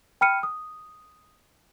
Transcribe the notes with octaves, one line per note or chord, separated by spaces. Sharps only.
G5 B5 F6 C#7 D#7
D#6